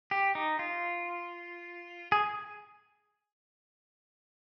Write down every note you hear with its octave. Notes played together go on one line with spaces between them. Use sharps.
G4
D#4
F4
G#4